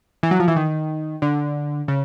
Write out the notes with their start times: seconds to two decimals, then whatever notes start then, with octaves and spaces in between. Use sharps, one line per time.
0.23 E3
0.31 F#3
0.40 F3
0.48 E3
0.56 D#3
1.22 D3
1.88 C#3